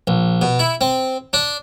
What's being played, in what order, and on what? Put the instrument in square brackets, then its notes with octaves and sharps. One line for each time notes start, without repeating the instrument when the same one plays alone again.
[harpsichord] A#1
B2
E4
C4
D4